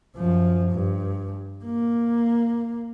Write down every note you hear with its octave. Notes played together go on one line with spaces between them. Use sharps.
F#2 F3
G2
A#3